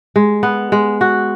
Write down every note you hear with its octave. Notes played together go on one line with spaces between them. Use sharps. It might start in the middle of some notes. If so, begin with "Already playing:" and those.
G#3
B3
G#3
F#4